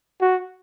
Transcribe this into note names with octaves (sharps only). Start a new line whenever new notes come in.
F#4